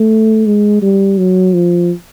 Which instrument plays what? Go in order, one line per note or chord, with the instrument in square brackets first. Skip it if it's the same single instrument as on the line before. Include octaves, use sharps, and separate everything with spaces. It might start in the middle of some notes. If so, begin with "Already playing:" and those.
Already playing: [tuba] A3
G#3
G3
F#3
F3